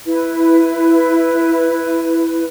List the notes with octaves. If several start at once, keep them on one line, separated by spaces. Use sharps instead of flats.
E4 B4